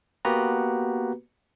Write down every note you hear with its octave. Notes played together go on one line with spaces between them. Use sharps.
A#3 B3 F#4 G4 B4 A#5